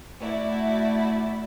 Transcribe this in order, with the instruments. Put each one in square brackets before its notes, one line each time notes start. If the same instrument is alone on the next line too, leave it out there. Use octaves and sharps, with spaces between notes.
[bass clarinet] A3 [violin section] E4 F#4 D5